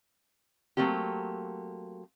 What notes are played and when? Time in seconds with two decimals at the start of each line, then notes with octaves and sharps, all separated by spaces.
0.77 F#3 A3 A#3 C4 G4